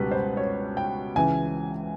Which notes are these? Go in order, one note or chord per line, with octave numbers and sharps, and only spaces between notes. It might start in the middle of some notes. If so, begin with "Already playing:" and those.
Already playing: C#2 B2 G3 B4
C5
C#5
G5
C#2 C#3 E3 G#5